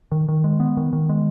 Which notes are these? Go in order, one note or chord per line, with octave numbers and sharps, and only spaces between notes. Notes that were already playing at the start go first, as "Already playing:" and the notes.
D#3
D#3
G#3
B3
D#3
D#3
G#3